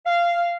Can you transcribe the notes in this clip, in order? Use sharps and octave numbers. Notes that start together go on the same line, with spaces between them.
F5